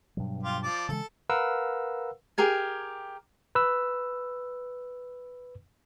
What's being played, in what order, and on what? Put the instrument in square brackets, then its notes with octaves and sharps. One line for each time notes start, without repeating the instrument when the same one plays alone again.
[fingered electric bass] G2 B2 F#3
[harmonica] F4 G4
F3 D5 A5
[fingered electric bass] C#3 E3 G#3 [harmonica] A4
[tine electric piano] A#4 B4 F5 F#5 E6
[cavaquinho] G4 G#4 A#4 G#5
[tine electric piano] B4 E6